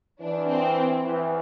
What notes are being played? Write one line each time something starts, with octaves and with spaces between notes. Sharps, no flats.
E3 D4
C4
E3